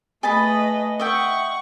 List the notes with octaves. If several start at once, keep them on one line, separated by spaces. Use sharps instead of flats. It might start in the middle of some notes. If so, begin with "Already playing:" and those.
A3 G#4 B4 D#5 A5 B5
D#5 E5 F#5 G5 C#6